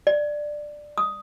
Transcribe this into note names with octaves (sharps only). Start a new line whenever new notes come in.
D5
D#6